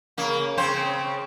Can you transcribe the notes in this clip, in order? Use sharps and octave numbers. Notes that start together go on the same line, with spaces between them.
C#3 A#3
C#3 C4 C5